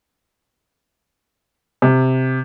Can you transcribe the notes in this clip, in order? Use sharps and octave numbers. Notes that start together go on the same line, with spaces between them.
C3